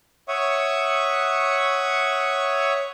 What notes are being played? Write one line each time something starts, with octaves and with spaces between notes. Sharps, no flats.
C#5 E5 F#5 C#6 D#6